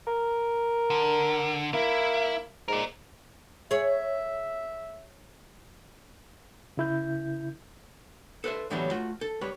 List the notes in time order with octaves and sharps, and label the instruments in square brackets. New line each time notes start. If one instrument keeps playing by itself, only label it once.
[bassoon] A#4
[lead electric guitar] D3
[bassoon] A#3 [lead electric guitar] E4
[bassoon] G#2 [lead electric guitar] A#4 D5
[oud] G#4 C#5 [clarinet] E5
[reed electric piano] C#3 E4 G6
[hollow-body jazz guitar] A4 B4 C5 E5
A2 D3 E3 F#3 G3 B3
A3 F4 F#4
A4
G3 B4 C#5